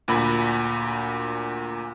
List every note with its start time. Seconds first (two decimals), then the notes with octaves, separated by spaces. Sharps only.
0.08 D2 A#2 B5